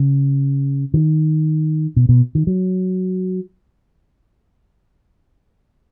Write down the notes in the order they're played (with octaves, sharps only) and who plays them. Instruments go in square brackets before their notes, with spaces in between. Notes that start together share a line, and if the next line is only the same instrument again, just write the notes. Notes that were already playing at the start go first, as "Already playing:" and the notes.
Already playing: [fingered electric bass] C#3
D#3
B2
B2
D#3
F#3